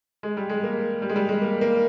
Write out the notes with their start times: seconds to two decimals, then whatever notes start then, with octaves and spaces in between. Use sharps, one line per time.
0.23 G#3
0.37 G3
0.50 G#3
0.64 A#3
1.02 G3
1.09 G#3
1.16 G3
1.29 G#3
1.42 A#3
1.61 A#3